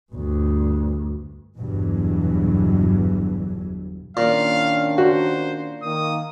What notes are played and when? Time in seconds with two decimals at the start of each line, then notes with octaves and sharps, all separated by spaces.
0.12 D2 G2
1.59 G1 E2 G2 B2 E3 F#3
4.17 A#2 D#3 C#4 D4 F5
4.98 F#4 C5
5.82 D#3 A#3 D#6